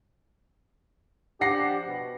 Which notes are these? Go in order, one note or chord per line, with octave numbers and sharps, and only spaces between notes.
F3 D4 G4 F#5 A#6 C7
B2